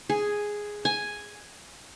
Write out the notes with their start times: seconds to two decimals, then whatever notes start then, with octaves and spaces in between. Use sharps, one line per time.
0.10 G#4
0.85 G#5